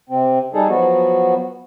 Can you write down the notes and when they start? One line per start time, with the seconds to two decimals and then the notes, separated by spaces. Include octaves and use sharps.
0.09 C3 C4
0.54 G3 D#4 G#4 A4
0.69 F3 F#3 B3 F#4